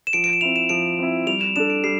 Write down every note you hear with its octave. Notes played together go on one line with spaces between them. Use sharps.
E7
F3 D7
D7
E7
C4 E4 F7
E7
F3 D7
C4 E4
G3 F7
E7
D4 A4 E7
D7
G3 C7